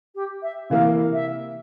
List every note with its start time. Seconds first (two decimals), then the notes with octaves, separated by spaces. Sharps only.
0.15 G4
0.42 E5
0.70 C3 E3 A#3 E4 A#4 F5
1.12 E5